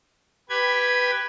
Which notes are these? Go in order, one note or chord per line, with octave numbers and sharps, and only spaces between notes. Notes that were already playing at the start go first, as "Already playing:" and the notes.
G4 B4 G#6